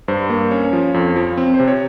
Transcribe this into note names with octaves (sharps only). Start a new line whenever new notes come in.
G2 C5
A#3
C#4 C#5
F3
F2
F3
C4
C5
C3
C#5